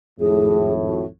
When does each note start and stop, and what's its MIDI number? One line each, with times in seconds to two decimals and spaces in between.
0.20 1.05 32
0.20 1.05 41
0.20 1.05 45
0.20 0.72 68
0.84 1.05 66